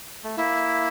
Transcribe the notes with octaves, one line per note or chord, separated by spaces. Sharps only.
A3
A#3 E4